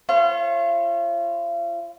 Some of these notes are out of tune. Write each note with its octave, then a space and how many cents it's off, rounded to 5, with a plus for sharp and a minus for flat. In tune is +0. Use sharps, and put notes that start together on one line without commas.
F4 -40 C#5 -45